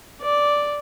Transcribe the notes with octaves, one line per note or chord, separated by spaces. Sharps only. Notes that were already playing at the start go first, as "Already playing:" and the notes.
D5